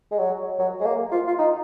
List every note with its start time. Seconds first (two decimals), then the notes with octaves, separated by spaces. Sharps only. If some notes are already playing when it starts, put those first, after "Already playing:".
0.11 G#3
0.19 F#3
0.59 F#3
0.80 G#3
0.86 A#3
1.12 F4
1.28 F4
1.39 D#4